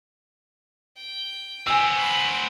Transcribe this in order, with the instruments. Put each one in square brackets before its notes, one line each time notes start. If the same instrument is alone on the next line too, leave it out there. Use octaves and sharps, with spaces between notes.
[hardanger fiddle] G5
[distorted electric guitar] B3 C4 [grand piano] G#5 E6
[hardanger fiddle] B5 C#6